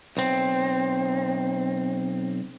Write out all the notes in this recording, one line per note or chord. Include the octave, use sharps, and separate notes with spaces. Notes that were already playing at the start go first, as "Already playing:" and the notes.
B1 C4